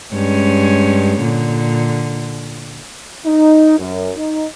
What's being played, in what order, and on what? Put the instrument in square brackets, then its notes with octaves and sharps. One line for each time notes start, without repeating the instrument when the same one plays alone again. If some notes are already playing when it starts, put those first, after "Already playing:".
[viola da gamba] G2 G#3 C#4
A#2 D3
[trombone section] D#4
F#2
D#4